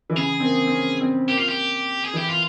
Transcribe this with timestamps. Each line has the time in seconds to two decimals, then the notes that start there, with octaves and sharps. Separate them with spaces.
0.10 E3
0.16 C#3 G#4
0.40 C4
0.44 A#3
0.67 C4
0.72 C#4
1.00 C4
1.28 A#3 G4
1.39 F4
1.49 G4
2.05 G#4
2.14 E3 G4
2.30 F4